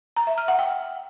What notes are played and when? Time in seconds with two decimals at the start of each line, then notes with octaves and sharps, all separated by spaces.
0.16 A#5
0.27 E5
0.38 F6
0.48 F#5
0.59 G5